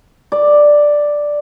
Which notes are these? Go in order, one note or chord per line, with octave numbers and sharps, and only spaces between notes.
D5